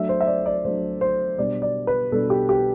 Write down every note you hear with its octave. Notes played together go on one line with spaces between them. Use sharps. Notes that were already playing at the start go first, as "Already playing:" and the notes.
Already playing: F#3 A3 D4 E5
C5
E5
D5
D5
F#3 A3 D4 C5
C5
B2 G3 D4 D5
D5
B4
B2 G3 D4 A4
G4
G4